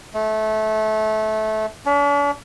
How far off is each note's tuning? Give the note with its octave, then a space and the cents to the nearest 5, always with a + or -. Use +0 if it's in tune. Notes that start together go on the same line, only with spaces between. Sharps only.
A3 -20
D4 -45